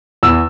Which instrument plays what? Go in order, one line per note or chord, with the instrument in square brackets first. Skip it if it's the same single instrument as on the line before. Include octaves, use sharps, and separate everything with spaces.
[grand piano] E2 E6